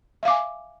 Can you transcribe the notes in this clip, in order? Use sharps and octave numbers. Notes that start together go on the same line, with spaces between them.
E5 F5 G#5 D6